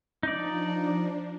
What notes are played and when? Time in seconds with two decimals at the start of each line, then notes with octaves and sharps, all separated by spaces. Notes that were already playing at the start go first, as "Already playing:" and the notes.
0.23 F3 D4 D#4 D5